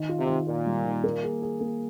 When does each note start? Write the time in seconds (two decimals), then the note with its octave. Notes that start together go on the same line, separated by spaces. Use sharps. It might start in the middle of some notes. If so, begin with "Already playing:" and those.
Already playing: D#3
0.09 F4
0.19 C3
0.29 D#3
0.47 A#2 F4
0.66 G3
0.85 D#3
1.04 A#3
1.23 G#4
1.42 G#4
1.61 A#3